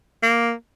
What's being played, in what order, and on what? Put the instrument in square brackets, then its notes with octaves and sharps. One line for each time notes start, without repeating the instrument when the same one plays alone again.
[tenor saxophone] A#3